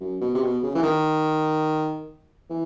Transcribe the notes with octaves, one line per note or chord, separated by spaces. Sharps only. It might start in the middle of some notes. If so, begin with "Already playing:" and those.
F#2
B2
C3
B2
C#3
E3
D#3
E3